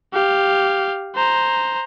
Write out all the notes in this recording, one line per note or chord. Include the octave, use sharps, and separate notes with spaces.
G4 F5
C5 A#5